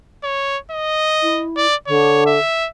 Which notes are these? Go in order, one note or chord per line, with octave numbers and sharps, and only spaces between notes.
C#5
D#5
E4
D5
D3 C#5
E5